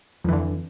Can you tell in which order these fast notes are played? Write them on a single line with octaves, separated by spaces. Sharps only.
F2 E3 D3